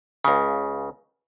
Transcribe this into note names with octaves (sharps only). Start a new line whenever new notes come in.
C#2 C#3